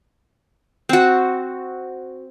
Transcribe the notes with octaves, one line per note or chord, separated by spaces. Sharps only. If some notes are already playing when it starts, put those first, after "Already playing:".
C4 F#4